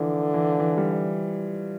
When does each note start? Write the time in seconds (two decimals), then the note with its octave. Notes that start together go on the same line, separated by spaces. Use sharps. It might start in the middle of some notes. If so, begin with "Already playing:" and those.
Already playing: D3 E3 F3
0.34 E3
0.60 E3
0.78 G3